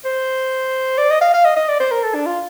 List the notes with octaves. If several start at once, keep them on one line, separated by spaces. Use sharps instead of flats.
C5
D5
D#5
F5
F5
D#5
D#5
D5
C5
A#4
A4
D4
F4